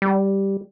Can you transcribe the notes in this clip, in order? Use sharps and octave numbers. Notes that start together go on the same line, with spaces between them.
G3